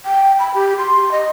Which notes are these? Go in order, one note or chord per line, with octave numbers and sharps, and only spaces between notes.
G5
B5
G4
C6
D#5